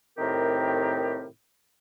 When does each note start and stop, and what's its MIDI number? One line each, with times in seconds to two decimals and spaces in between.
0.18 1.26 45
0.18 1.26 48
0.18 1.26 51
0.18 1.26 60
0.18 1.26 67
0.18 1.26 70